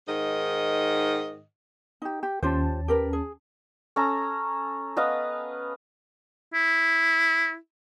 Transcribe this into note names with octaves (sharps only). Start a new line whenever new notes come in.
G#2 D#3 D#5
D#4 G4
G4
D#2 C#4 F4 G4 C5 A5
G4 A#4 B4
G#4
C#4 A4 A#5
B3 B4 D#5 F5
E4